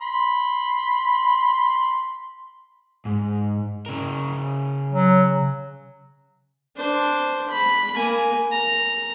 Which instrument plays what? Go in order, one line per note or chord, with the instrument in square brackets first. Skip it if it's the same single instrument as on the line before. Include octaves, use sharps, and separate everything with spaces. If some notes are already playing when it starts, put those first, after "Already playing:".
[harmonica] B5 C6
[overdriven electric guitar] G#2
C#3 A#4
[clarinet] F#3
[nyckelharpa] D4 C5
B5
A#3 G#5
A#5